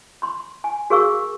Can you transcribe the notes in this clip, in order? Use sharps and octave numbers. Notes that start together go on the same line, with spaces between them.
B5 C6
G#5
F#4 G#4 A#4 F5 C#6 E6